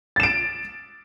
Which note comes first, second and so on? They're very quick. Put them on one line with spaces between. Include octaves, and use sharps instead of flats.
A6 E7 D7